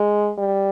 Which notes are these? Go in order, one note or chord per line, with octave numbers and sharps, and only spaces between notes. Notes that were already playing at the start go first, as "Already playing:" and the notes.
Already playing: G#3
G3